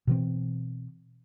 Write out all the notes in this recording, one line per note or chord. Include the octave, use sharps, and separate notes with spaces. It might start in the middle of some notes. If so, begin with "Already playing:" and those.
B2 E3 C4